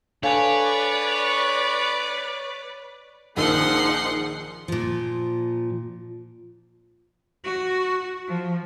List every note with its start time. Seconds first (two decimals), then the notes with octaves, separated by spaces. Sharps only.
0.23 D4 A4 B4 C#5 D5 F5 G#5
3.37 A#1 D#3 F3 D#4 G#4 F#5 C6 E6
4.68 A#2 F3
7.44 F#4
8.28 F3